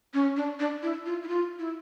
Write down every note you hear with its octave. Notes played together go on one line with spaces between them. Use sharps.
C#4
D4
D4
E4
F4
E4
F4
E4